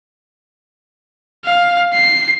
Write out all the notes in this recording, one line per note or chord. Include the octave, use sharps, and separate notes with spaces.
F5
C7